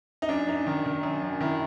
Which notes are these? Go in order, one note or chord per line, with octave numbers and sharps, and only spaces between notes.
D#4
F#2 D4
F#2 D#4
D#3
D#3
F#2
F#2
D#3 E4